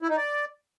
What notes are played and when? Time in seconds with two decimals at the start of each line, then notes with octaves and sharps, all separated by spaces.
0.02 E4
0.10 D#4
0.17 D5